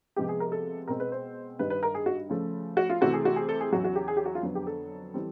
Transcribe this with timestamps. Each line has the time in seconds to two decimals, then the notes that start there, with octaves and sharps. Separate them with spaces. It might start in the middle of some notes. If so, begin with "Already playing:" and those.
0.16 C3 F3 G#3 B3 G4
0.29 G#4
0.40 A#4
0.52 A4
0.88 B2 G#3 C4 A#4
1.00 B4
1.12 C5
1.59 G2 D#3 G3 B4
1.70 B4
1.83 A#4
1.95 G#4
2.06 F#4
2.29 C#3 F3 A3
2.77 F#4
2.90 F4
3.01 C3 E3 A3 C4 F#4
3.13 G#4
3.25 F#4
3.36 G#4
3.49 A4
3.61 G#4
3.72 E2 C#3 F#3 F#4
3.84 F#4
3.96 G4
4.08 G#4
4.17 G4
4.26 F#4
4.35 F4
4.43 F2 D3 F#3 B3
4.55 G4
4.67 A4
5.14 E3 G3 C4